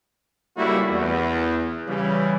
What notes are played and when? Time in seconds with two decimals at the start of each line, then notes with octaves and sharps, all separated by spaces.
0.57 C#2 G3 A3 A#3 E4 F#4
0.89 E2
1.87 C#3 E3 G3